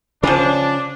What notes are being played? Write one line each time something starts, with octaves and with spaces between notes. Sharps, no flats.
C#3 F3 C#4 D4 F4